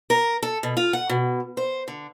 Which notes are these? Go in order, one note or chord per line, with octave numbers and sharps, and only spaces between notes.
A#4
A4
B2
F4
F#5
B2
C5
D3